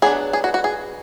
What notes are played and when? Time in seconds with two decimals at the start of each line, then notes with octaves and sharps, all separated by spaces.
0.02 F#3 B3 D4 G#4
0.33 G#4
0.44 F#4
0.54 F#4
0.64 G#4